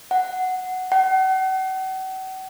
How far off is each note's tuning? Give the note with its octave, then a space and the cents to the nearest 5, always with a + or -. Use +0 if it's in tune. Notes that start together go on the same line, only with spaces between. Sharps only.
F#5 +0
F#5 +40